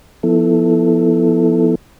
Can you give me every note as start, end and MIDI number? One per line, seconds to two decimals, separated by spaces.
0.23 1.75 53
0.23 1.75 59
0.23 1.75 64
0.23 1.75 69